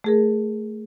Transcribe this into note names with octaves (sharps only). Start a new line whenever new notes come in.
A3 G#4 A#4